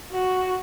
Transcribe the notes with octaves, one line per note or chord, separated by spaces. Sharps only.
F#4